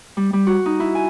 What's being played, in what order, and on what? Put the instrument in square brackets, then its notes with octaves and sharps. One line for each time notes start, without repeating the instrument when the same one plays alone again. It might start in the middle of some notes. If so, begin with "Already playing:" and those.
[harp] G3
G3
F#4
D#4
E4
G#5